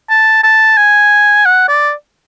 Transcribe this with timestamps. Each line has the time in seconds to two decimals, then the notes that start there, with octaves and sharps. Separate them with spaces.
0.10 A5
0.43 A5
0.77 G#5
1.45 F#5
1.68 D5